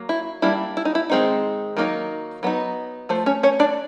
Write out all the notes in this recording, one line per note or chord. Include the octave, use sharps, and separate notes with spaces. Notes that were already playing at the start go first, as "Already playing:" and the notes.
Already playing: F#3 A#3
E4
G3 A#3 D4 E4
E4
D#4
E4
D#3 G#3 C4 D#4
D#3 F#3 A#3 D#4
F#3 B3 D#4
F3 A3 C5
C#4 C#5
C#4 C#5
D4 D5